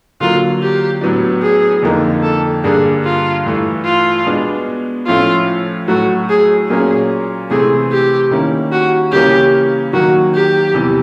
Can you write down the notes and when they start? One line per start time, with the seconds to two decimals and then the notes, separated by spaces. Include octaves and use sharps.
0.20 D3 F#3 A#3 F4
0.62 G4
1.01 A2 F#3 B3 D4
1.42 G#4
1.83 F2 D3 F3 A#3 D#4
2.23 A4
2.64 G2 D3 G3 A#3 D4 G#4
3.04 F4
3.46 G2 E3 A3
3.85 F4
4.26 B2 G#3 B3 D4
5.07 A2 F3 A3 C#4 E4 F4
5.88 A2 F#3 A3 F#4
6.29 G#4
6.69 A#2 F#3 A#3 C#4 G#4
7.50 C3 E3 A3 C4 G#4
7.91 G4
8.31 D#3 G3 A#3 C#4 E4
8.72 F#4
9.12 C#3 E3 G3 A#3 C#4 G4
9.93 D#3 F#3 A#3 F#4
10.35 G4
10.74 E2 C3 E3 G3